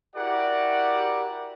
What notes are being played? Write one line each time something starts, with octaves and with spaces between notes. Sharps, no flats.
E4 F#4 G4 A#4 D5 F#5